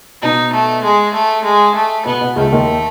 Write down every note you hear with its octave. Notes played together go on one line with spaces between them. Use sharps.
B2 D#4
A3
G#3
A3
G#3
A3
B2 B3
B2
C#2 C#3 A3
D#2 D#3